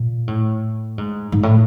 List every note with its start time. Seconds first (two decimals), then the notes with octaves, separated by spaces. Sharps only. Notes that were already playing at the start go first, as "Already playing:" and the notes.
Already playing: A#2
0.28 A2
0.98 G#2
1.32 G#2
1.43 A2